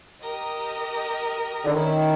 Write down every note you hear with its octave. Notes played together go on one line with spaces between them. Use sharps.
G4 A#4 D#5
D3
D#3 A3 C#4 E4